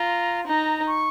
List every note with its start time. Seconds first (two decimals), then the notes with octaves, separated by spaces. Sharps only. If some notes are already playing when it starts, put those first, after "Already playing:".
Already playing: F4 A#5
0.47 D#4 A#5
0.87 C#6